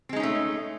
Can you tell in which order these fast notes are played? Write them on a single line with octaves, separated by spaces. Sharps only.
C4 G#3 D#4 C#4 A3